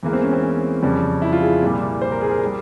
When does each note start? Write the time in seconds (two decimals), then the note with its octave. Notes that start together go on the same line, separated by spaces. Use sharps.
0.03 E2 E3 G#3 A#3
0.13 C4
0.23 C#4
0.33 C4
0.43 C#4
0.82 F2 C#3 G3
1.22 E4
1.33 F4
1.42 G#4
1.62 C2 A#2 G3
2.02 C5
2.12 A#4
2.21 G#4
2.31 A#4
2.45 G3